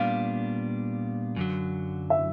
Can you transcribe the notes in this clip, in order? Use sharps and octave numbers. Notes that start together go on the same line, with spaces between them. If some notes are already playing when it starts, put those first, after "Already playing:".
Already playing: A#2 G3 B3 D4 F5
F#2 D3 F#3
E5